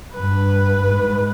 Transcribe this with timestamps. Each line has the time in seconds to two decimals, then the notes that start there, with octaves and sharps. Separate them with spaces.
0.13 G2 B4
0.81 G#2